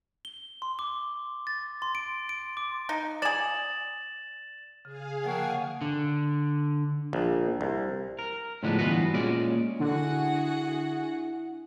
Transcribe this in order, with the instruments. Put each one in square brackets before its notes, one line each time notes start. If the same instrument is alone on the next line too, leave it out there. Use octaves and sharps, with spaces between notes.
[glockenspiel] G7
C6
D6
A6
C6
D7
D7
D6
[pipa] D#4
[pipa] G#4 D5 [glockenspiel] A6 E7 F#7
[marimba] C#3 [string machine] G#4 F5 G#5
[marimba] D3 F3 [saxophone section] A#3 C#5 [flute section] F#5 G5 A5
[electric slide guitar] D3
[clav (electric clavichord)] A#1
C2
[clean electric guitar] A#4
A2 D3 F3 G#3 B3 D4
G2 E3 B3 F4 F#4 B4
A#2 G#3 C#4 D5
[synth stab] D3 [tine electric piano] D4 [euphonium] E4 [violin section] F#4 G#4 F#5